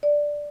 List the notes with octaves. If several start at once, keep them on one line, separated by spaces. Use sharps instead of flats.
D5